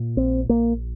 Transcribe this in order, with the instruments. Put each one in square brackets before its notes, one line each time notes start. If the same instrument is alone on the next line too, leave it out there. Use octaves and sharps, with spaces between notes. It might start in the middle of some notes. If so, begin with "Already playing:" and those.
Already playing: [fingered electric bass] A#2
A#1 C4
A#1 A#3